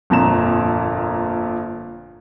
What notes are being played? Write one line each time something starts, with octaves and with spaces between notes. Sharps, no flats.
G1 F2 A#2 A#5 E7